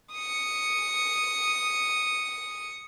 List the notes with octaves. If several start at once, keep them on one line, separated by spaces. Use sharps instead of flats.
D#6 C#7